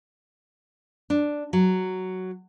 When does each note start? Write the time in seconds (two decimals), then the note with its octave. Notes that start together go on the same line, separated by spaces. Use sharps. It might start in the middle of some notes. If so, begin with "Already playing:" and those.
1.10 D4
1.53 F#3